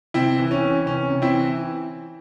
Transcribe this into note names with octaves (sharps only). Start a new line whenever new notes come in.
C3 C4 E4
E3
C#4
E3
C3 C#4
C3
C4 E4
E3